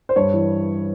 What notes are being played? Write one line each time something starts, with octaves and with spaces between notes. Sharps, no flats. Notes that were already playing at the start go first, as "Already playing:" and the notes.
C5
G2 C#5
E3